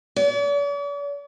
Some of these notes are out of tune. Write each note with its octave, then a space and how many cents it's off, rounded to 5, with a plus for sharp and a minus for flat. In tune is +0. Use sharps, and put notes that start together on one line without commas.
D5 -45